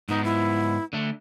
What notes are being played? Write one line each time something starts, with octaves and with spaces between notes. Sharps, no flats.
G#2 B3 D#4
E4
D3 A3